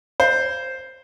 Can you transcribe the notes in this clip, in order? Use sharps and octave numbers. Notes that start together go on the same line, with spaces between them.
C5